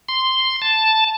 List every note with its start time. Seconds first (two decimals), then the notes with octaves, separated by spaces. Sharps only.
0.09 C6
0.62 A5